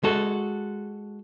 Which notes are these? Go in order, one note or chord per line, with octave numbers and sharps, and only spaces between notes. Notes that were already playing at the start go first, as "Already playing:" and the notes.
G#3 F#4 A4